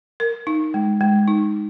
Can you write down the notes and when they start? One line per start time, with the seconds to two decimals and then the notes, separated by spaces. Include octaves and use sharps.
0.20 A#4
0.47 D#4
0.74 G#3
1.01 G#3
1.28 D#4